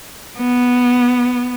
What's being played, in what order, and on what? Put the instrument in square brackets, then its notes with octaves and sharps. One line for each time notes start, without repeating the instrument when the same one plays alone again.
[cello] B3